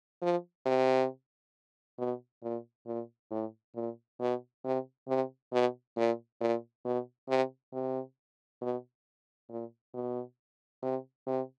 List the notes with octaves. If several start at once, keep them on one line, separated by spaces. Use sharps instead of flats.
F3
C3
B2
A#2
A#2
A2
A#2
B2
C3
C3
B2
A#2
A#2
B2
C3
C3
B2
A#2
B2
C3
C3